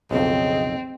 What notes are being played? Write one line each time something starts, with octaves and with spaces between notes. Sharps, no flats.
B1 F2 C#3 C4 D#5